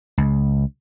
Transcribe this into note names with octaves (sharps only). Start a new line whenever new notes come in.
C#2